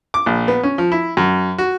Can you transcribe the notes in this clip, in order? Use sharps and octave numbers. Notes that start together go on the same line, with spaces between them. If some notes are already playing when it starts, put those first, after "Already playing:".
D6
A#1
B3
C#4
F3
E4
F#2
F#4